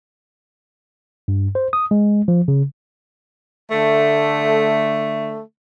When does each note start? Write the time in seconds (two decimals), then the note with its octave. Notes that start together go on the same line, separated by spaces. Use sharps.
1.28 G2
1.55 C5
1.73 D#6
1.91 G#3
2.28 F3
2.48 C#3
3.71 D3 A3